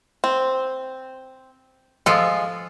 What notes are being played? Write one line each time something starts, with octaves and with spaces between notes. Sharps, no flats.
C4
F3 G#3 F4 A4